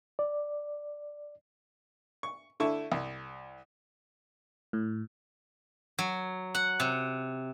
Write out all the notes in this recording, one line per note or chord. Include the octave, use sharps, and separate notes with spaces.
D5
C#6
D3 A3 E4 A5 C#6
C2
A2
F#3
F#5
C3